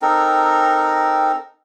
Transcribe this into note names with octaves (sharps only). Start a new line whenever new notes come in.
C4 D#4 A4 A#4